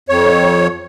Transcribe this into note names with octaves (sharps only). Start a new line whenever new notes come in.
F2 C#5